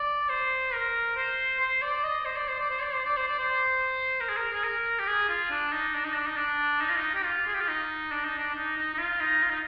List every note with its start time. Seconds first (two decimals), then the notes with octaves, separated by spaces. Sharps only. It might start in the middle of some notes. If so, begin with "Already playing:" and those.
Already playing: D5
0.30 C5
0.73 A#4
1.17 C5
1.60 C5
1.82 D5
2.04 D#5
2.25 C5
2.36 D5
2.48 C5
2.60 D5
2.70 C5
2.82 D5
2.93 C5
3.05 D5
3.17 C5
3.28 D5
3.39 C5
4.21 A#4
4.29 G#4
4.37 A#4
4.53 G#4
4.64 A#4
4.99 G4
5.08 G#4
5.30 F4
5.51 D4
5.73 D#4
5.95 D4
6.05 D#4
6.16 D4
6.27 D#4
6.37 D4
6.81 D#4
6.90 F4
6.97 D#4
7.15 G4
7.25 F4
7.47 G#4
7.54 G4
7.61 F4
7.68 D#4
8.12 D4
8.25 D#4
8.38 D4
8.55 D#4
8.77 D#4
8.94 D#4
8.98 F4
9.21 D#4
9.43 F4
9.50 D#4